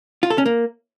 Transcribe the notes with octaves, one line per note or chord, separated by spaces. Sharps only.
F4
A4
C#4
A#3